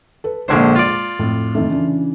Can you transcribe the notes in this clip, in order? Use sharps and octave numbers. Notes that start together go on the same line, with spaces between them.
A4 B4
A#1 D3 G#3 C5 G#6
F4 D5
F2 A2
F2 D#3 A3
C#3 E3 D4